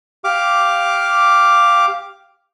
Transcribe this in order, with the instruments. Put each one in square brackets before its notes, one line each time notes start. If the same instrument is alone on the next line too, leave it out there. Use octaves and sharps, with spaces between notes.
[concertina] G4 F5 D6